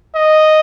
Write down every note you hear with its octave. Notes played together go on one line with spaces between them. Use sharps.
D#5